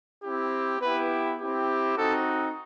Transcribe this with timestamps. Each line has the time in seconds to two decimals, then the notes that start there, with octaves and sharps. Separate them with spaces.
0.24 C4 E4 G4
0.81 B3 E4 G4 B4
1.38 C4 E4 G4
1.95 C4 D#4 F#4 A4